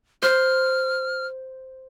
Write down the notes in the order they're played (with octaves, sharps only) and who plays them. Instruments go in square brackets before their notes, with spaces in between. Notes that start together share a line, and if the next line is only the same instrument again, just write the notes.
[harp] C5 [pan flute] F6